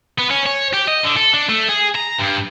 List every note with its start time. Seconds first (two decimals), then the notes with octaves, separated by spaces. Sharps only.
0.18 B3
0.30 C#4
0.46 C#5
0.73 G4
0.88 D#5
1.04 D3
1.16 A4
1.33 D4
1.49 A3
1.69 G#4
1.95 A#5
2.19 G2